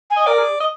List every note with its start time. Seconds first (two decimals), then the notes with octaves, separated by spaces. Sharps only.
0.10 G#5
0.17 D#5
0.26 A#4 D5
0.38 G#4
0.60 D#5